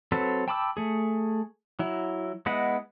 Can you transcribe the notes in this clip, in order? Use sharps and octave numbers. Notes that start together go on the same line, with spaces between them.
F#3 C4 A4 B4
G5 A5 B5 D6 E6
A3 G#4
F#3 E4
G#3 B3 E4 D#5 F#5